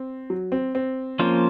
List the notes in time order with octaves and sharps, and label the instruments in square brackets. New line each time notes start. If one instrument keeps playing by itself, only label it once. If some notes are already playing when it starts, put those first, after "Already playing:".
Already playing: [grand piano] C4
F#3
C4
C4
[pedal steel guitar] F3 A#3 C#4 F4 C5